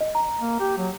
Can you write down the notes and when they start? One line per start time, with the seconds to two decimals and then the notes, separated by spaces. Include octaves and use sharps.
0.01 D#5
0.15 A#5
0.40 A#3
0.60 G4
0.78 F#3